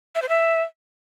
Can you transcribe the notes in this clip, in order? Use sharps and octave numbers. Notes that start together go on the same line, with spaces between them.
E5
C5
E5